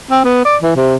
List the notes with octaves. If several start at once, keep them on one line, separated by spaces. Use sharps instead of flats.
C4
B3
D5
E3
C3